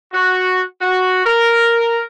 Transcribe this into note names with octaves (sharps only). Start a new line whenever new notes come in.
F#4
F#4
A#4